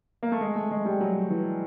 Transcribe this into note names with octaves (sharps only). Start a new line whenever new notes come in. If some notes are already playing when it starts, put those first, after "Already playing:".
A#3
A3
G#3
A3
G#3
G3
F#3
E3